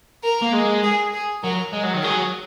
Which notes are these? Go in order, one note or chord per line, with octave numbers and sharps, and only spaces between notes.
A#4
A#3
G#3
G#4
G#4
F#3 A#4
G#3
F#3
D#3
F#3 G#4